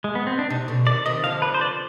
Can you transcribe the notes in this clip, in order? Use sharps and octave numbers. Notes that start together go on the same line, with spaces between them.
G#3
B3
C4
D4
C3 D#4
B2 D3
C3 D#3 D5
C3 D#3 D#5
D3 F3 F5
B4
C5
D5